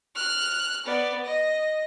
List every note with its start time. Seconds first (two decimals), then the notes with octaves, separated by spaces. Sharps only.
0.15 F6 F#6
0.86 B3 D5
1.25 D#5